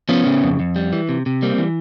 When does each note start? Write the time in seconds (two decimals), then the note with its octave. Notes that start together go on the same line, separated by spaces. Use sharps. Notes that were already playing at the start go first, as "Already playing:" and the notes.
0.09 F3 B3 C#4
0.26 C#3
0.43 F2
0.60 F2
0.76 G3
0.93 E3
1.09 C3
1.26 C3
1.42 G3 A#3 C4
1.58 E3